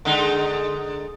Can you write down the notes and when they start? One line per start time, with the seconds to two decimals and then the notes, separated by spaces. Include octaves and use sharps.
0.05 D3 G#3 D#4